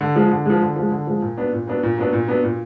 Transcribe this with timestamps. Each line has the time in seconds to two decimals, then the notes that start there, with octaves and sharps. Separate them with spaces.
0.01 D3
0.16 F3 G#3
0.31 D3
0.45 F3 G#3
0.62 D3
0.76 F3
0.81 G#3
0.92 D3
1.07 F3 G#3
1.22 A#2
1.38 F#3 B3 D4
1.53 A#2
1.67 F#3 B3 D4
1.83 A#2
1.98 F#3 B3 D4
2.13 A#2
2.28 F#3 B3 D4
2.44 A#2